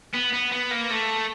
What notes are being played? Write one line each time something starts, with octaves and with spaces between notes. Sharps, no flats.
B3
B3
B3
A#3
A3